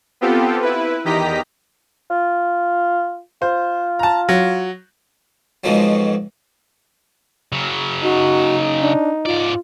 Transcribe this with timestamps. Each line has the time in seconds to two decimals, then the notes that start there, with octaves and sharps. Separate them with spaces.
0.21 B3 C4 F4 G4 A4
0.62 E4 B4
1.05 E2 D#3 G4 D#5 A#5 B6
2.10 F4
3.42 F4 C5
3.99 A5 A#5
4.29 F#3
5.64 F2 G#2 B2 F3 F#3
7.52 C#3 F#3
8.03 D#4 F#4
8.81 D4
9.26 G#2 F4 D5